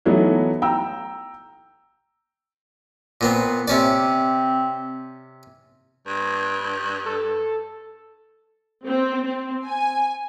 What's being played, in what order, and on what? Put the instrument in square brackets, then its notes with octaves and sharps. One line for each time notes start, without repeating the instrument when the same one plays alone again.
[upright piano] E3 F#3 A3 B3 D#4
G5 A#5 E6
[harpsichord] A#2 B3 C4
[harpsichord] C3 C#4 D5 [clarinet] C4
[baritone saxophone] G2
[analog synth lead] A4
[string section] C4
C4
G#5